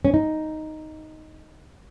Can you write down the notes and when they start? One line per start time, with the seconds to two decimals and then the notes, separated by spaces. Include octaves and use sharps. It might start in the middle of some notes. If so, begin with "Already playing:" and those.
0.05 C#4
0.14 D#4